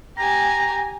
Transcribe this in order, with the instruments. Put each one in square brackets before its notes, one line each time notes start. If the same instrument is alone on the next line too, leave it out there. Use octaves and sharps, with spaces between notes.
[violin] G4 G#5 [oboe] A#5